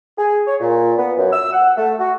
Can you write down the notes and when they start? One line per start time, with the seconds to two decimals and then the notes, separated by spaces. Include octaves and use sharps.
0.18 G#4
0.47 C#5
0.60 A#2
0.98 B3
1.17 F#2
1.32 E6
1.52 F#5
1.77 A3
1.99 F#4